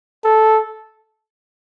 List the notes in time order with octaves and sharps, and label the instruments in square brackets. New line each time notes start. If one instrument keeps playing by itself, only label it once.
[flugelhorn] A4